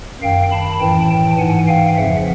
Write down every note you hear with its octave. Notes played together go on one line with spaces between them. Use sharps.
F#2 D#3 F5 G5
A5 B5
A2 E3 G5 A5
G5 A5
G#2 E3 F#5 G#5
F5 G5
F2 C#3 F3 E5 F#5